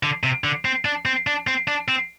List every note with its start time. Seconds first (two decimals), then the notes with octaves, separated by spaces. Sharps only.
0.03 D3
0.23 C3
0.44 D3
0.65 C4
0.85 D4
1.06 C4
1.27 D4
1.47 C4
1.68 D4
1.88 C4